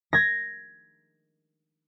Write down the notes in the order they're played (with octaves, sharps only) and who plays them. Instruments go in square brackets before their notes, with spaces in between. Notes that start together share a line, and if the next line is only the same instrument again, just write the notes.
[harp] G#6 A#6